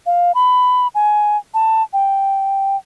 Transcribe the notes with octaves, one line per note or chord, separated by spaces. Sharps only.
F5
B5
G#5
A5
G5